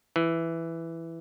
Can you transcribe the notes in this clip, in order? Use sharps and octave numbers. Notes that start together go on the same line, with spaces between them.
E3